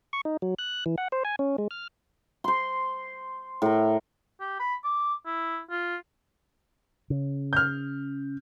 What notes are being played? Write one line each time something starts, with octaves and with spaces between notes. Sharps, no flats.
C#6
D#4
F#3
F#6
E3
F#5
C5
G#5
C#4
G#3
F6
C5 C6
A2 A#4
G4
B5
D6
E4
F4
C#3
F6 G6